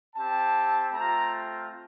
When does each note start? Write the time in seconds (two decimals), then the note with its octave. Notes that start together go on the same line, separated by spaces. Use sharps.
0.15 C4 G4 A5
0.92 A3 C4 F4 A#5